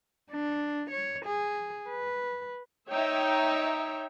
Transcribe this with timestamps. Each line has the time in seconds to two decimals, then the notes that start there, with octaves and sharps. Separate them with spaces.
0.31 D4
0.90 C#5
1.25 G#4
1.89 B4
2.90 D#4 C#5 E5 G5